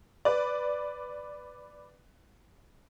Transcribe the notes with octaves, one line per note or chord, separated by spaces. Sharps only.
B4 D5